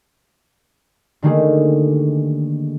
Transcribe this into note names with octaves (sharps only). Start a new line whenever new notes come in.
D3 D#3 A3 A#3 G4 G#4